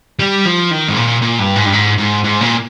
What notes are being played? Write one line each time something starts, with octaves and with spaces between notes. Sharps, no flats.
G3
F3
D#3
G#2
A#2
A#2
G2
G#2
G2
G#2
G#2
G#2
A#2